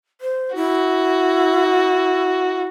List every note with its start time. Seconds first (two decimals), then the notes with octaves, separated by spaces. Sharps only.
0.21 C5
0.55 E4 F#4